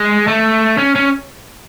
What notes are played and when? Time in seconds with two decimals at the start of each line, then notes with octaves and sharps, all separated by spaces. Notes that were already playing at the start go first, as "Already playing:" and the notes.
Already playing: G#3
0.28 A3
0.78 C#4
0.96 C#4